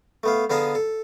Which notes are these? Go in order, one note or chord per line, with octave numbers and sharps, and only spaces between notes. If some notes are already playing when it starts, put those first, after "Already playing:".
A3 B3 F5
D3 B3 G#4 F5 A5 A#5
A4